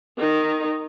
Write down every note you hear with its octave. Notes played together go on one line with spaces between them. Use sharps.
D#3 D#4